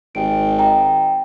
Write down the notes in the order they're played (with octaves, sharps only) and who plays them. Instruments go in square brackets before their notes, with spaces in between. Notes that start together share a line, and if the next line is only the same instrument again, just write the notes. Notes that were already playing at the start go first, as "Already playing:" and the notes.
[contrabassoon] G#1 [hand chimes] G4 G5 D7
[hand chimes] D#5 G5 A#5